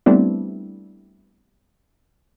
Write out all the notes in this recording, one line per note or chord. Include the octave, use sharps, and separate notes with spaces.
G3 A3 B3 C4 D4 E4